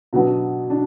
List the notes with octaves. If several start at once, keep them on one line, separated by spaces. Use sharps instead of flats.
B2 F#3 B3 D4
D4